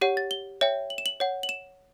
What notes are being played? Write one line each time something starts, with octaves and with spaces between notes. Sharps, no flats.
G4 C#5 F#5
A6
G7
C#5 E5 G5
F#7
E7
F#7
C#5 F#5
F#7
E7